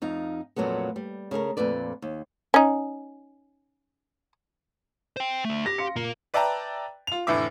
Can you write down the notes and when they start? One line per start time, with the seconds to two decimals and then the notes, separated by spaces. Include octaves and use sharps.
0.02 F2 D#4 F5
0.56 F2 A#2 F#3 A3 B3
0.96 G3
1.31 C#3 A3 G#4 A#4
1.57 F2 A#2 A3 B4 D5
2.02 D#2
2.54 C#4 D#4
5.17 C5 G5
5.45 D3 A3
5.66 G4 A#6
5.78 F5 C6 C#7
5.96 A#2 A#3 A#4
6.34 B4 D5 E5 G5 A5 A#5
7.07 F4 F7
7.27 F1 A2 D3 E3 E5 D6